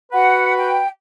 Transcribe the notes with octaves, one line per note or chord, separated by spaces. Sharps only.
F#4 B4 F#5
G5